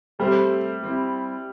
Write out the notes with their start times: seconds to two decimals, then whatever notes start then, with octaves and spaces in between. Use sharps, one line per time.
0.19 G3 A3 C4 G4 C5 E5
0.82 G3 C4 E4